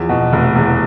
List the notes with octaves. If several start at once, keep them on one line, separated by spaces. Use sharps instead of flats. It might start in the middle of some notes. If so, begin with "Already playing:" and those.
Already playing: E2 F3
B2
F1
E2